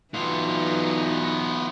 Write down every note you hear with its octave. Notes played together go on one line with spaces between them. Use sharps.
E3 F#3 B3 D#4 F4